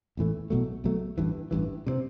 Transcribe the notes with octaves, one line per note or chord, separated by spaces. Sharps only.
A1 A2 E3 A3
B1 B2 F#3 A3
B1 B2 F#3 A3
A1 G2 E3
A1 G2 E3
C3 F#3 C4